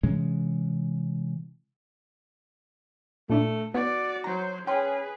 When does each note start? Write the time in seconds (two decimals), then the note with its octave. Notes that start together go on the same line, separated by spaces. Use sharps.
0.03 C3 E3 G#3 C#4
3.30 A#2 A3 D4 E4
3.74 B3 F#4 D5
4.24 F#3 C5 A#5
4.67 C#4 G#4 B4 G5 C6